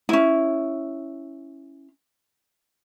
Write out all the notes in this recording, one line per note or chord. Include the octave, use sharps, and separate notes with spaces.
C#4 E4